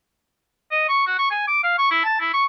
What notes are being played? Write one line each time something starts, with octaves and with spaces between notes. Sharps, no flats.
D#5
C#6
F#4
C#6
G#5
D6
F5
C#6
E4
A5
E4
C#6